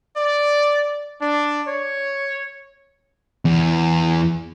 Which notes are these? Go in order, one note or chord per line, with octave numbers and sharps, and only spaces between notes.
D5
D4
C#5
E2